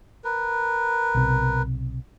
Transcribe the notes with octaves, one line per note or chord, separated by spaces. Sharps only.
A#4 B4
B1 C3